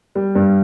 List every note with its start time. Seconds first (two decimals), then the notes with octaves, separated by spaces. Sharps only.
0.15 G3
0.35 G2